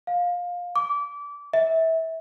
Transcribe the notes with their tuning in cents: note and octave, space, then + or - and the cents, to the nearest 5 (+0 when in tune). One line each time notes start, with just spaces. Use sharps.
F5 +20
D6 -25
E5 -25